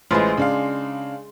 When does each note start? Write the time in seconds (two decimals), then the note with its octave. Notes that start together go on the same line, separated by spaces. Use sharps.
0.11 A1 G#3 F4 B4 C5
0.37 C#3 D4 F5